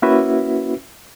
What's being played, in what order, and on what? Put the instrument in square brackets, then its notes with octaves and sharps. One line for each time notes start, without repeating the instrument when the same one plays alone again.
[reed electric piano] A#3 C#4 E4 F#4 B4 E5